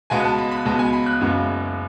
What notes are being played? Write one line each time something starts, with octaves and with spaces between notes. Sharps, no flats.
C#2 B2 G#3 B3 G#5
A5
B5
B5
C#2 B2 G#3 B3 A5
G#5
B5
F#6
F#1 F#2 C#3 G#3 B3